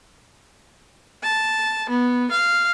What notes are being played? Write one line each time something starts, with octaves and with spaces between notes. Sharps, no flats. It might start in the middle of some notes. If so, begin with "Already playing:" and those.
A5
B3
F5